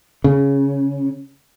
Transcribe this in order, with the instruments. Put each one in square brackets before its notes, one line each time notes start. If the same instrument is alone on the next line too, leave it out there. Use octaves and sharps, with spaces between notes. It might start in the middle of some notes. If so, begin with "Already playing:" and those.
[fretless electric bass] C#3